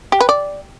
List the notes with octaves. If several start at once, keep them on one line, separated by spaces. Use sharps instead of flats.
G4
B4
D5